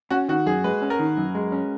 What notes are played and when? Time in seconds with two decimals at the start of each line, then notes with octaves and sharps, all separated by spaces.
0.11 C#4 F#4
0.29 D#3 F#4
0.46 F#2 G#4
0.64 G#3 B4
0.82 C#4
0.90 A#4
0.99 D#3
1.17 F#2
1.35 G#3
1.52 C#4